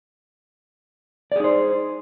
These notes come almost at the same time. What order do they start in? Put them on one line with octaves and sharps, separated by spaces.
D5 G#4 D#4 C5